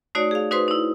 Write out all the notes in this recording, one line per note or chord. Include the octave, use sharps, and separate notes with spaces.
A3 D#4 F#4 C#5 D5
G#4 F5
D#4 F#4 B4 C5 C6
D#4 E4